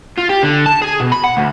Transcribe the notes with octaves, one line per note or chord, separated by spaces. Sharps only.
F4
G4
D3
A5
G#4
B2
B5
F#5
D2